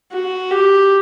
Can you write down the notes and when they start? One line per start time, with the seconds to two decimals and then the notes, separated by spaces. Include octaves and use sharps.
0.12 F#4
0.50 G4